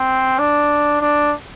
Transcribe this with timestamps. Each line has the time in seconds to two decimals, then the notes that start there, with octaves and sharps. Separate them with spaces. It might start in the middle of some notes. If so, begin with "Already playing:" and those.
Already playing: C4
0.39 D4
1.01 D4